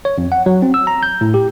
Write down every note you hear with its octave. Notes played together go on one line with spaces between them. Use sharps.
C#5
F2
F#5
F#3
C4
E6
A#5
G6
A2
G4